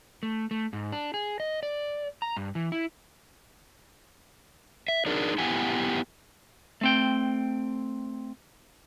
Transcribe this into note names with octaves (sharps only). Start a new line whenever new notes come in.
A3
A3
G#2
D4
G#4
D#5
D5
A#5
G2
E3
E4
E5
D4 D#4 G#4 A#4
B3 E4 G4 F#5 G#5
A3 C4 G5